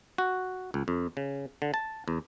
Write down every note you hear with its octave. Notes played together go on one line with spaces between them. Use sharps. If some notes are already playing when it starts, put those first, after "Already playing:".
F#4
C#2
F2
C#3
D3
A5
E2